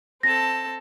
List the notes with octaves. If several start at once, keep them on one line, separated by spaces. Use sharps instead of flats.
C4 A4 A5 A#6